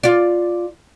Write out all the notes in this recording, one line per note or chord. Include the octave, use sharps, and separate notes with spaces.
F4 D5